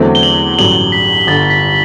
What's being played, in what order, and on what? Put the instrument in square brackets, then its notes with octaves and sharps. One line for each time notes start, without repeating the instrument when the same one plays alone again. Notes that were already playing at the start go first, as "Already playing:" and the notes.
Already playing: [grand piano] E2 D3 F#3 A3 C4
[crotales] G7
F#7
[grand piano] A1 G2 D3 F#3 [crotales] F#7
[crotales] B6
[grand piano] G1 G2 D3 [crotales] A6
[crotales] B6